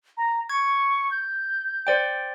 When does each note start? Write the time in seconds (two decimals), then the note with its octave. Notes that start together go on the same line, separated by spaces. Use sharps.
0.17 A#5
0.50 C#6 G#6
1.11 G6
1.87 C5 D5 G5